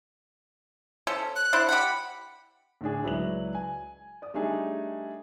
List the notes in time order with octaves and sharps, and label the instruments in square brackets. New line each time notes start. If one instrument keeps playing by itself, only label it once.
[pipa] C#4 A4 C5
[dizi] F#6
[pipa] D4 E4 C5
[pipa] G4 F#5 [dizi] B5
[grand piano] A2 D3 D4 G#4
C#2 F#3 E4 B4 D5 F#7
G#5
D5 D#6
G3 A3 D4 D#4 G#4